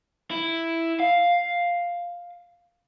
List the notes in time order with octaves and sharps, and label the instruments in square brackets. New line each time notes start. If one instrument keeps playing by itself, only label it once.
[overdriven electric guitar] E4
F5